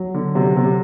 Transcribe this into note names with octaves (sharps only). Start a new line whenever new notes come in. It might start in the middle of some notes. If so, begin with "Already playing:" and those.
Already playing: F#3
D3
C3 F#3
C3